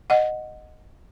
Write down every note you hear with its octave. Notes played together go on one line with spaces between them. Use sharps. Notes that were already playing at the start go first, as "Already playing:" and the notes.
D#5 F#5